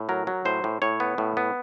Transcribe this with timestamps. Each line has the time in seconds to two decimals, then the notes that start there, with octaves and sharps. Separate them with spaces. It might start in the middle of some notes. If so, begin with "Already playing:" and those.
Already playing: A2
0.09 F#3 A#4
0.27 F#3
0.45 A2 C5
0.64 A2
0.82 A2 C#5
1.00 B3
1.18 A2
1.37 B3